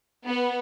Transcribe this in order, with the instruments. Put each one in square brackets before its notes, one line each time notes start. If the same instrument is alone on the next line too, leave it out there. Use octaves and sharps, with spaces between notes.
[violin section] B3